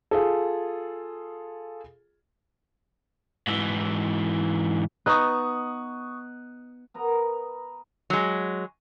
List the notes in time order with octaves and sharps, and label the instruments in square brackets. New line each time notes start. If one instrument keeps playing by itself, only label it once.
[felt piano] F4 G#4 A4
[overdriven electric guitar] G#2 E3
[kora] B3 D#4 [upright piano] C#6 D#6 F#6
[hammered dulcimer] B3 A#4 D#5 A#5
[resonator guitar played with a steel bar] F#3 G#3